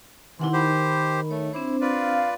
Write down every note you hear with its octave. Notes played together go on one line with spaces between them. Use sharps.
C3 D#3 E3 E4 F#5 C6
G4 C5 B5
A3 C#5
C4 D4 E4 C5
F4 B4 D5 F5